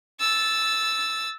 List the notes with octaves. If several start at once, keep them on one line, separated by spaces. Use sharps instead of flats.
E6 A6